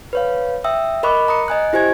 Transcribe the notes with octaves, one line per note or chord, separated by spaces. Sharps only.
B4 C#5 F5
E5 G5 D#6 E6
A#4 D#5 B5 C#6 D6 F#6
A#5 D#6 C#7
D#5 G#5 F#6
E4 G4 C5 G#5 G#6